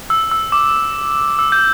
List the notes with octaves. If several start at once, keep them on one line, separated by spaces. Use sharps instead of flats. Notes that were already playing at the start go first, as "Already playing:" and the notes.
E6
E6
D6
E6
G6